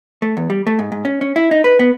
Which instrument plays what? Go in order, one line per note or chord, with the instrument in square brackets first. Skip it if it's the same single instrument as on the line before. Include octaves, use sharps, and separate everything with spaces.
[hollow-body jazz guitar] A3
E2
G3
A3
G#2
G#2
C#4
C#4
E4
D#4
B4
B3